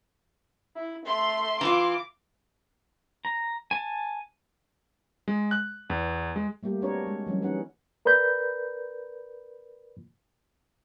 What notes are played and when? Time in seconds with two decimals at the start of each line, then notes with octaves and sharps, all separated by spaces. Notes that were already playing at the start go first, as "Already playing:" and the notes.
0.76 E4
1.06 A3 E5 C6
1.61 E3 F4 D6
3.25 A#5
3.71 G#5 A5
5.28 G#3
5.51 F#6
5.90 E2
6.36 G#3
6.63 G3 A3 A#3 G4
6.82 B3 C4 D4 F#4 A#4 C#5
7.07 G#3
7.27 E3 F#3 G3 C#4
7.42 E3 B3 C#4 D#4 F#5
8.05 A#4 B4 D5 B5 G6